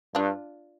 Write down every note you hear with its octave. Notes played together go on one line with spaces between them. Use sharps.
G2 D4 F4